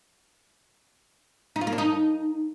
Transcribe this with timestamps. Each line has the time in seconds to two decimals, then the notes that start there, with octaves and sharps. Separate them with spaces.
1.56 D#4
1.61 F4
1.67 A#3
1.72 D4
1.78 D#4